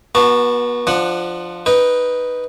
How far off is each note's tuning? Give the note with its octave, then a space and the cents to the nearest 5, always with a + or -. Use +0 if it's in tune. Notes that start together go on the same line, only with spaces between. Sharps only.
B3 -35 F#4 +0 A5 +5
F3 +0 D4 +25 F#5 +0
D#4 +0 B4 +0 G5 +0